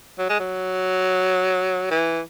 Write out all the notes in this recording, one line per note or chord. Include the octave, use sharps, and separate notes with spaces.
F#3
G#3
F#3
E3